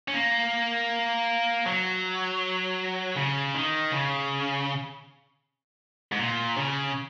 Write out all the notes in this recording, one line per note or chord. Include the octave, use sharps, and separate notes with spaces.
C#4
A#3
F#3
C#3
D#3
C#3
G#2
A#2
C#3